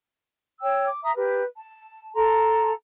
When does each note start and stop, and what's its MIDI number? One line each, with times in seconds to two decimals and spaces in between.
0.60 0.87 73
0.60 0.87 79
0.60 0.87 88
0.87 0.99 86
1.03 1.11 76
1.03 1.11 82
1.03 1.11 87
1.16 1.42 67
1.16 1.42 70
1.16 1.42 71
1.57 2.13 81
2.15 2.71 69
2.15 2.71 81
2.15 2.71 82
2.15 2.71 84